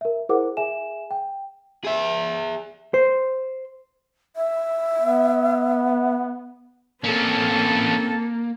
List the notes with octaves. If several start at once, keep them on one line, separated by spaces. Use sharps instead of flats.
A#4 E5
E4 G#4 A#4 C5 F#5 D6
G#4 E5 G#5 E7
G5
G#4 E5
C5
E5
B3
A2 A#3 C4 C#4 A4